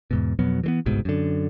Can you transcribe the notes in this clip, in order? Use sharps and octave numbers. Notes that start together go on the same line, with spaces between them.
E2 G#2 B2
F2 B2 F#3 B3
E3 G#3 B3
G1 C2 G#2 B2
F#2 D3